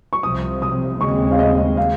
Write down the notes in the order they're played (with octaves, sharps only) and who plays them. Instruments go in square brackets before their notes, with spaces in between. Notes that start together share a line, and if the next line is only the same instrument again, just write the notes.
[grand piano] C#6
[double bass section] C2 C3 F3 [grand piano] D#6
[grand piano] D#6
[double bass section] D#2 C#3 G#3 C4 [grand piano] C#6
[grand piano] F5
D#5
F5